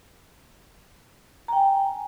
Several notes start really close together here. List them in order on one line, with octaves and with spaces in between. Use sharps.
A#5 G5 G#5